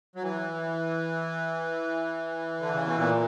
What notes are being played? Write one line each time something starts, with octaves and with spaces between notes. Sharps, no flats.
F#3
E3
D3
C#3
B2
A#2